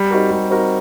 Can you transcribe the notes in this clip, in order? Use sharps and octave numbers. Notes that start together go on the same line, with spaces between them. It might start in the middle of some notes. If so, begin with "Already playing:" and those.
Already playing: G3
C4 D#4 F#4 A#4
G3
C4 D#4 F#4 A#4